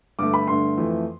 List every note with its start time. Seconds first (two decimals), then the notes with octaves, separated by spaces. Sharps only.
0.19 G2 D3 A3 D6
0.34 B5
0.47 G2 D3 A3 C6
0.77 F2 E3 A3